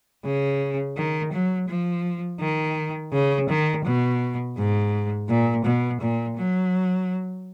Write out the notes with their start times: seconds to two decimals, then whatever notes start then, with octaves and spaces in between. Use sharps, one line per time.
0.25 C#3
0.97 D#3
1.32 F#3
1.69 F3
2.40 D#3
3.13 C#3
3.49 D#3
3.85 B2
4.57 G#2
5.29 A#2
5.65 B2
6.01 A#2
6.37 F#3